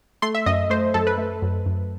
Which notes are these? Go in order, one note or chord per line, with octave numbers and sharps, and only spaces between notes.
A3 C6
E5
F#2 D#5
A3 C5
F#2 A4
B4
A3
F#2
F#2